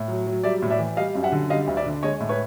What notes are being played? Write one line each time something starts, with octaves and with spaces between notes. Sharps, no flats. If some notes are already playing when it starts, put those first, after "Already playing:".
Already playing: A2
F#3
F#3
G3 D5 E5
A2
D5 E5
E3
G3 D#5 F5
F#2
E5 F#5
D3
G3 D#5 F5
D2
D5 E5
D3
G#3 C#5 D#5
A2
B4 C#5